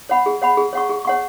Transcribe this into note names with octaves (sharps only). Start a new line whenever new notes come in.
C#5 F#5 B5
G#4
C#5 F#5 B5
G#4
C#5 F#5 C#6
G#4
C#5 F#5 C#6